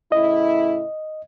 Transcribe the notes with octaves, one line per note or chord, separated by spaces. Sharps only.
A2 C#3 E4 D#5